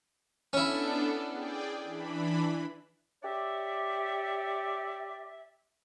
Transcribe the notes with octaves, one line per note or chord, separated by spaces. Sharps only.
B3 C#4 D4 E4 A4
G#4 D5 G5
E3 D4 B5
G4 C#5 D5 E5